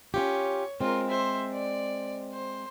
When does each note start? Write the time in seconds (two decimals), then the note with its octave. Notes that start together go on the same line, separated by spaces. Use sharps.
0.14 C#4 F4 G4 C#5
0.81 G#3 C4 F4 A#4
1.09 C5 E5
1.53 D5
2.33 C5